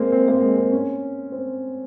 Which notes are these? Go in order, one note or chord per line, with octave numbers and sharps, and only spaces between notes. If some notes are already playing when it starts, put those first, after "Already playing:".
Already playing: G#3 A#3 C4
C4
A#3
G#3
C4
C#4
C4